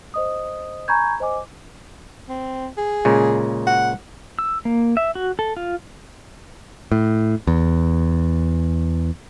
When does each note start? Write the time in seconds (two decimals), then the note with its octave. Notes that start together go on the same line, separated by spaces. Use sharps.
0.14 C5 D#5 D#6
0.88 G#5 A#5 B5 C#6 G6 G#6
1.20 C5 D#5 G#5 D6
2.29 C4
2.78 G#4
3.05 A#2 C#3 G#3
3.67 F#5
4.39 E6
4.65 A#3
4.97 E5
5.15 F#4
5.39 A4
5.57 F4
6.92 A2
7.47 E2